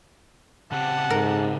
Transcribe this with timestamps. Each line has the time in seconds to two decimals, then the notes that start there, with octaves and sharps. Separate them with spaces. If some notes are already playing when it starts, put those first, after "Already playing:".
0.72 C#3 C4 G4 F#5 A5
1.10 G#2 A#4